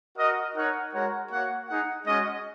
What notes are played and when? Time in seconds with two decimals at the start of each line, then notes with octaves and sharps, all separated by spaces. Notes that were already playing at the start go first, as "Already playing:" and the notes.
0.17 F#4 A#4 D#5
0.56 D#4 A#4 C#5 F#5
0.93 G#3 F#4 A#4 C#5 F#5
1.30 A#3 F#4 C#5 F#5
1.68 D#4 G#4 F#5
2.05 G#3 C#4 F#4 D#5